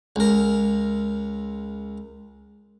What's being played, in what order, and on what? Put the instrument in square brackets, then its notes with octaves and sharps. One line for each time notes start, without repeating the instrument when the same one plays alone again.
[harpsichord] C#2 A#4